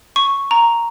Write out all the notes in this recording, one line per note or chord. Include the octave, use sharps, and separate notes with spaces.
C#6
A#5